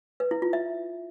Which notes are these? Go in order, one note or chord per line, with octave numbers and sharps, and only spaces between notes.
B4
E4
F4
E5